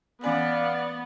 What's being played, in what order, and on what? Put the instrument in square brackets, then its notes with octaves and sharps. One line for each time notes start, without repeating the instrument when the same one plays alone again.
[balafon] E3 C#4 G#5 [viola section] B3 [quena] D5 [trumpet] F5